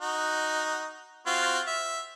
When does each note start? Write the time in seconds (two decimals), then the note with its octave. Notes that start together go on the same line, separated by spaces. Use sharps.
0.01 D#4 F#4
1.26 C4 F4 F#4
1.67 E5